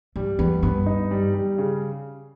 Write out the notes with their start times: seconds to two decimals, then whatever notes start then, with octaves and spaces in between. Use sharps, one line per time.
0.16 G2 G3
0.39 E2 B3
0.63 G2 B3
0.86 D#4
1.11 G3
1.34 G3
1.58 C#3